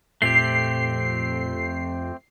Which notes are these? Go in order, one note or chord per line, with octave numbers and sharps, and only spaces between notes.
F2 A#2 A3 C4 G4 C7